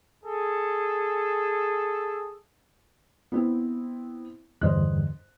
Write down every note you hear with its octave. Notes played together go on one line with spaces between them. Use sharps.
G#4 A4
B3 C4 E4
E2 G2 D3 C5 D#5 F#6